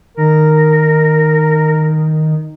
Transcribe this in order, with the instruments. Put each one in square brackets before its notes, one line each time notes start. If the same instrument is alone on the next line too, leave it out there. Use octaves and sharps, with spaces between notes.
[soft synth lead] D#3 [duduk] A#4